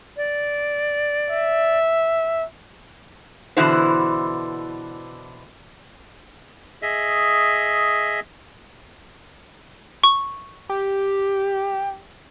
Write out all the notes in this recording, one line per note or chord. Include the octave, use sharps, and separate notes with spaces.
D5
E5
B2 D3 E3 E4 F#4 C5
G#4 D#5 E5
C#6
G4